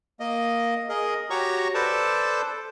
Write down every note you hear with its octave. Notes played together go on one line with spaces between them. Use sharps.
A#3 D#5
G#4 A#4 D#5
F#4 G4 C#5 A#5 C#6
A4 B4 C5 D5 A5